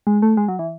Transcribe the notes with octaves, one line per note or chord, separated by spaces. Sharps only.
G#3
A3
G#3
F#3
E3